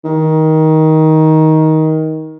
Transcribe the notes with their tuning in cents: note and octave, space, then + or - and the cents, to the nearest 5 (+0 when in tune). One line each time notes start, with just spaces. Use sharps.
D#3 +15